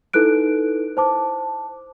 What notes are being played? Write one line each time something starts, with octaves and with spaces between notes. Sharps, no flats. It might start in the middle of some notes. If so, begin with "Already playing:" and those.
D#4 E4 A4 B4 F#6 D7
C5 A5 D6